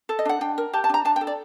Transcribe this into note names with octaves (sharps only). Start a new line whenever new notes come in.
A4
D#5
D4 F#5
D4 G5
A#4
G4 A5
A5
D4 A#5
D4 A5
G5
A4
D5